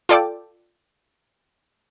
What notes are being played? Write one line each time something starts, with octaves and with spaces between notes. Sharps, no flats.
F4 A4 D5 G5 D6